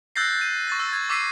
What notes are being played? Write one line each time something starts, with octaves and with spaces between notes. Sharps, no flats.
E6 F#6 G6 A6 A#6 C7
D#7
C#6 A6 A#6
E6 A6
G#6
C#6 D6 E6 B6 C7 D#7